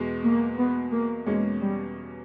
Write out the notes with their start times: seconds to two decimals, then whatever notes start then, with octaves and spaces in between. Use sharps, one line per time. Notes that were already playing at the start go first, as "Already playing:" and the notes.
Already playing: E2 B2 G#3
0.24 A#3
0.59 B3
0.92 A#3
1.26 E2 B2 G#3 A#3 C#4
1.61 G3